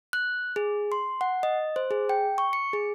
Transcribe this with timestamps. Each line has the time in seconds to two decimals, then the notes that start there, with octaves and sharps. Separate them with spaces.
0.13 F#6
0.56 G#4
0.92 C6
1.21 F#5
1.43 D#5
1.76 C5
1.91 G#4
2.09 G5
2.38 C#6
2.53 C#7
2.73 G#4